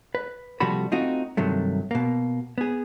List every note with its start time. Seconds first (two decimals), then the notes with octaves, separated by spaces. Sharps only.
0.15 B4
0.60 C3 F3 G3 A3 F#4 B5
0.92 A3 C4 D#4 F4 F#4
1.37 G2 C3 D#3 F#3 A3
1.91 B2 A#3
2.58 B3 G#4